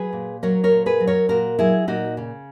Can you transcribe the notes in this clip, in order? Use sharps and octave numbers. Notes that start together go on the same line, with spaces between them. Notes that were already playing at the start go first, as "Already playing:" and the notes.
Already playing: F#3 G#4 B4
A#2
F#3 A#4 C#5
A#4 C#5
A#2
G#4 B4
F#3
A#4 C#5
A#2 F#4 A#4
F#3 E4 G#4
A#2 D#4 F#4
C#3